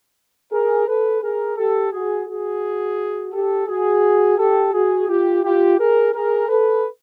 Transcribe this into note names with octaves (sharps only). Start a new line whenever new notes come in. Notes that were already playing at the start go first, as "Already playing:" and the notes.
G#4 A#4
A4 B4
G#4 A#4
G4 A4
F#4 G#4
F#4 G#4
G4 A4
F#4 G#4
G4 A4
F#4 G#4
F4 G4
F4 G4
G#4 A#4
G#4 A#4
A4 B4